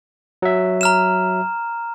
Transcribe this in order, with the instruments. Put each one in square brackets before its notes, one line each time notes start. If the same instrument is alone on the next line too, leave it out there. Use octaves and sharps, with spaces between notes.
[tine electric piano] F#3 E5
[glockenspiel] A#5 F6 E7